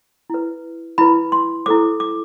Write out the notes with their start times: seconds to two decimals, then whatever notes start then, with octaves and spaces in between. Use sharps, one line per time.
0.30 E4 B4
0.98 E4 B4 B5
1.32 C6
1.66 E4 A4 C5 D6
2.00 D6